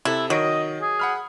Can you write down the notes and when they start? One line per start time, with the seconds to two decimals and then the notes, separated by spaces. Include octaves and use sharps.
0.05 C3 E4 A4
0.30 D#3 F#3 D#5 D#6 D7
0.81 G#4
0.99 F#5 B5 F6